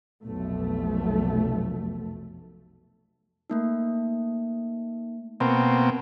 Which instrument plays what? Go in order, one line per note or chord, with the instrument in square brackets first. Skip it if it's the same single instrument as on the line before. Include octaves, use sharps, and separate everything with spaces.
[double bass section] F1 B1 A3
[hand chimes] A3 A#3 D#4
[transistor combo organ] B2 A#3 C4 [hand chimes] G5 B5